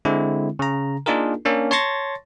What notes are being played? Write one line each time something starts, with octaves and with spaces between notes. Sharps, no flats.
D3 G#3 C4 E4
C#3 A#5
A#3 D4 D#4 F4 G#4 A#4
A#3 C#4 D4
C#5 A5 C6 C#6 A6 A#6